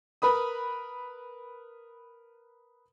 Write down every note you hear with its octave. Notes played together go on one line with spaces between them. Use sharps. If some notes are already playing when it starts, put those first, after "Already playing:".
A#4 B4 B5 D#6